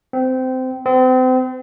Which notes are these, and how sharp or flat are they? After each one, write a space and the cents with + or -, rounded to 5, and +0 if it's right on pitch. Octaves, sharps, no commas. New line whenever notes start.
C4 -20
C4 -35